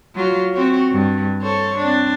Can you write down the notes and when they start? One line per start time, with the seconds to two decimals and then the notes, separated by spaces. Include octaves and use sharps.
0.15 F#3 F4
0.52 C4 F#4 C#5
0.92 G2
1.42 A4 C5 C#5
1.77 C4 D4